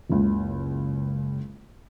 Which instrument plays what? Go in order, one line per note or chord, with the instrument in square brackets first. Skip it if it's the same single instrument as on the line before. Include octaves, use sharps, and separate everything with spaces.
[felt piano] F#1 C#2